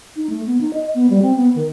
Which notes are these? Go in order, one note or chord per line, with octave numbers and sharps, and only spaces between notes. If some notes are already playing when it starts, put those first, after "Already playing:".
D#4
A3
B3
D#4
D#5
B3
G3
C4
B3
D#3